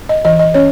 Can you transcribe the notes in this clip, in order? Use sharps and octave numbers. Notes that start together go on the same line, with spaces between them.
D#5
E3 D#5
D#5
C#4 C#5